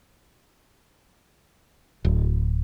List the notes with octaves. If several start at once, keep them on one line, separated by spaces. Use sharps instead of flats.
D1